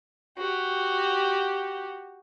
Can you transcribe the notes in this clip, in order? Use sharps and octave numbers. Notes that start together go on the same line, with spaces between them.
F#4 G4